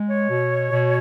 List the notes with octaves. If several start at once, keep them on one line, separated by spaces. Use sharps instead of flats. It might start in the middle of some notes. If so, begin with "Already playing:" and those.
Already playing: G#3
C#5
B2
B2